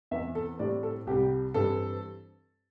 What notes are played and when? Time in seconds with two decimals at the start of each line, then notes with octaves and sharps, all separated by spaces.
0.11 E2 E3 C4 E5
0.35 A4
0.59 A2 G3 C4 D5
0.83 A4
1.07 C2 C3 G3 G4
1.54 G2 E3 G3 C4 A4